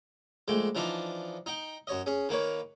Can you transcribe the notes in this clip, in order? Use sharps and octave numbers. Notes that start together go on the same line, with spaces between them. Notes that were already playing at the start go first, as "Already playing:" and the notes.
A#1 G#3 A3 G5
E3 F3 D4 D#4
D#4 G5
F#2 C#5 D#5
C#4 G#4
D#3 A#3 B4 C#5